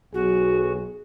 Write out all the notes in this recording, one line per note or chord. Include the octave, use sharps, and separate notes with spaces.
B1 F#4 G#4